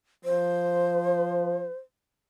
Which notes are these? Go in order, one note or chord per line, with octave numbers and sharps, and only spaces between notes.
F3 C5